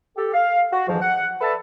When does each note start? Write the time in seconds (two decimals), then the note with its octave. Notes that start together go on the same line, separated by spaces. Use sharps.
0.17 G4 A4
0.34 F5
0.72 F#4
0.87 F2 G#2 E3 F3
1.01 F#5
1.41 A4 B4 D5 E5 A5